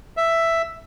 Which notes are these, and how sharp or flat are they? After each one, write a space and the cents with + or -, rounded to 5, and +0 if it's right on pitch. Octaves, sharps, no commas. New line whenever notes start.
E5 +5